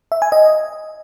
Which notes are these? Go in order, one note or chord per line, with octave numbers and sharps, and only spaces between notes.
E5
G#5
D#5